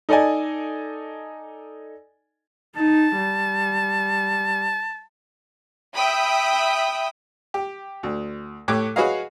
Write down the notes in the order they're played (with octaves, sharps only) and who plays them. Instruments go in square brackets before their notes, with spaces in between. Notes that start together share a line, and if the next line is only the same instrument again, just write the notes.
[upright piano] D#4 A4 D5 D#5 G#5
[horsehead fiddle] D#4 [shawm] A5
[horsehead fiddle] G3
[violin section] E5 G5 B5 D#6
[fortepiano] G4
D2
A2 G4 C#5 D6 F#6
F#4 G#4 B4 C#5 D#5 F5